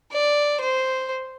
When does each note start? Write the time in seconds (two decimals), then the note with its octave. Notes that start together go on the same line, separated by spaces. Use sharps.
0.12 D5
0.60 C5